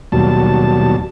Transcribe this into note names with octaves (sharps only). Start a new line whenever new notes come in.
D#2 B2 F#3 G3 A5